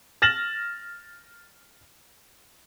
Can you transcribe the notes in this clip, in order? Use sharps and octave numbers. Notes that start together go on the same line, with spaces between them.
F6 A6 A#6 E7 F#7